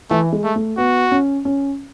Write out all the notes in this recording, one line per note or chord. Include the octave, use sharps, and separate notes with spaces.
E3 A3
G#3
A3
A3
B3 F#4
C#4
C#4